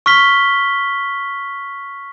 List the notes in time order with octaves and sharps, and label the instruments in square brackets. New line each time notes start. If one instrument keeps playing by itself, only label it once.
[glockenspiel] C#6 F6 B6 G7